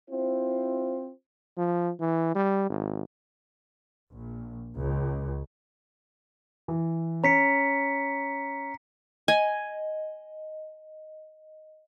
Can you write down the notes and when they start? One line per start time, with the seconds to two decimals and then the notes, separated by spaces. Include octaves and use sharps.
0.11 C4 E4 F4 C5
1.57 F3
2.00 E3
2.35 G3
2.69 G#1
4.11 A#1
4.76 C#2
6.68 E3
7.24 C#4 A#5 B6 C#7
9.28 D#5 G#5